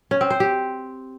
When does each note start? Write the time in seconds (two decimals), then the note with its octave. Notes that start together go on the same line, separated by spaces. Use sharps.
0.11 C#4
0.21 C4
0.30 C5
0.40 G4